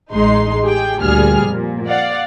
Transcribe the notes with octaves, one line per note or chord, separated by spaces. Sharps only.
A1 G#3 D#4 C6
G4 G#4 G5
D2 A#2 G3 G#4 F6
F2 A#2
D5 F5 F#5